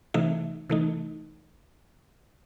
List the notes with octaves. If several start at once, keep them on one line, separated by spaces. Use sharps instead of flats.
C3 E3 A3 D#4 E5
C3 E3 A3 D#4